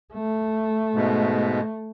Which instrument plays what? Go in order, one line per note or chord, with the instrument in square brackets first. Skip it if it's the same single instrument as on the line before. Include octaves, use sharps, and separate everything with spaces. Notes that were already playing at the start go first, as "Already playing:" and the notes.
[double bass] A3
[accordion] G#2 B2